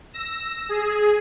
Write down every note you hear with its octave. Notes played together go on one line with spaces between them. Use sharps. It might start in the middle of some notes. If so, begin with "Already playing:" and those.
E6 A#6
G#4